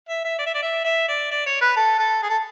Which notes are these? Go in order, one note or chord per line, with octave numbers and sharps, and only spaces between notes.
E5
E5
D5
E5
D5
E5
E5
D5
D5
C#5
B4
A4
A4
G#4
A4